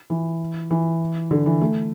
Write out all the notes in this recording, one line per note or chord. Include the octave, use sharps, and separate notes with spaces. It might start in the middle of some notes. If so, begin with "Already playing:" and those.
E3
E3
D3
E3
A3